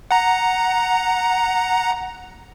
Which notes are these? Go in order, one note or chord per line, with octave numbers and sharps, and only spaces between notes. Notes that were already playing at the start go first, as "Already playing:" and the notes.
F#5 A#5